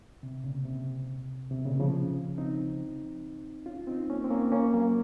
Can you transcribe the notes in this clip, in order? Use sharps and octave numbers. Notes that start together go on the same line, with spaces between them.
C3
A#2 C#3
C3
C3
A#2 C#3
C#3 F3
C4 D#4
C#4 F4
C4 D#4
A#3 C#4
C4
A#3 C#4
A#3 C#4
F#3 A#3